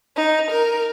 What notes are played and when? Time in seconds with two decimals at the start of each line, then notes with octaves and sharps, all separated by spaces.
0.16 D#4
0.49 A#4